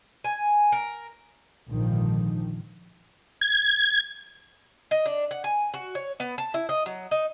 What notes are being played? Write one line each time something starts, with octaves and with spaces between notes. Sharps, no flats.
G#5
A#4
A#1 F2 G#2 D3 D#3 F3
G#6
D#5
D4
F#5
G#5
F#4
C#5
B3
A5
E4
D#5
F#3
D#4